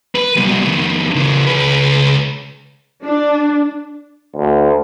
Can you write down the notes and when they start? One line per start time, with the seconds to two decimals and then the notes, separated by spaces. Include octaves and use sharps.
0.16 B4
0.36 C2 B2
0.65 F2 D#3
1.15 C#3 E3
1.47 C#2 B4
3.03 D4
4.36 D2